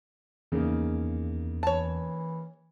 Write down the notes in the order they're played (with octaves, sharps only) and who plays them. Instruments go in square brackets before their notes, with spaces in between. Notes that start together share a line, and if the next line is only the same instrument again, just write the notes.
[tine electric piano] E2 [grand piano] C#3 A#3 D#4
[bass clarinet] E3 [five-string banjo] C#5 A5